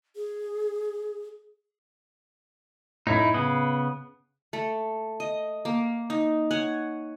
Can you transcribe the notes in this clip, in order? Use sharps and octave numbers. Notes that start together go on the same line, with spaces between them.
G#4
F#2 A2 D#4 E4
C#3 B3
A3
D#5
A#3
D#4
C#5 F#5 G#5